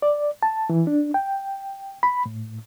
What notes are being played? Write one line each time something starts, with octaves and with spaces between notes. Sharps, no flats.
D5
A5
E3
D4
G5
B5
A2